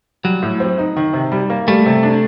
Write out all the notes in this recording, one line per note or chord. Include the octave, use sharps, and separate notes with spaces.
F#3 G3
A2
C4
D#4
D#3
C3
G3
A#3
G3 A3
C3
D4